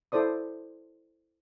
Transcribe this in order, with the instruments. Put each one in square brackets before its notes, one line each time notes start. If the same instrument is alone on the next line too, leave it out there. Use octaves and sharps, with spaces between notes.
[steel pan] E4 A4 C5 D5 D#6